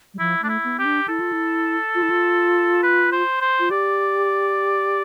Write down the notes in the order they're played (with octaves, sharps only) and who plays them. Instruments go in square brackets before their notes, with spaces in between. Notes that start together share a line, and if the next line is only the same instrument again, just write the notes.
[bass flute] G3
[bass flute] F3 [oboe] E4
[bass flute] A3 [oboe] D4
[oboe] E4
[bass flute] B3
[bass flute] C4 [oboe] G4
[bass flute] D4
[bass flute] E4 [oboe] A4
[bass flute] F4
E4
F4
E4
F4
[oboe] B4
C5
C5
[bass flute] F4
[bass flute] G4 [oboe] D5